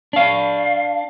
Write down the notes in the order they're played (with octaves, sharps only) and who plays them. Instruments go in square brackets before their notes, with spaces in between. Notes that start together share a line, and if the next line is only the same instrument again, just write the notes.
[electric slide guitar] D4 F5